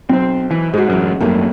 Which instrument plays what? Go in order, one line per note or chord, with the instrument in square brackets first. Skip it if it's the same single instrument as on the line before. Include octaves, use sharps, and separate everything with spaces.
[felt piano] B1 C5 [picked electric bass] C4
[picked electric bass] E3
[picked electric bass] G#2 [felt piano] G#3 F#4
[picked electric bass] A1 F#2
[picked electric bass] G#1 F#2 [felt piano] G3 A3 A#3